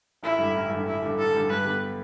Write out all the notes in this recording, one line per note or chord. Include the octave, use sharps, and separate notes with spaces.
A1 E4
G2 D3
A1
G2 D3
A1 E4
G2 D3
A1 A4
G2 D3
G2 B4
D3 G3 B3